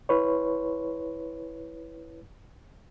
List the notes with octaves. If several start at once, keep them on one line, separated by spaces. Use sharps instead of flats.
E4 B4 C#5